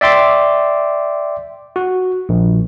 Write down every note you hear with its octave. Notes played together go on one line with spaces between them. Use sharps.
D5 E5 G5 C6 D6
F#4
A#1